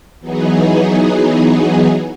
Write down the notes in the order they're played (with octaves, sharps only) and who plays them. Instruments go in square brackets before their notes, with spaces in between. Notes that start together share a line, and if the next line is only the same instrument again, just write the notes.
[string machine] E3 F#3 B3 D#4 G#4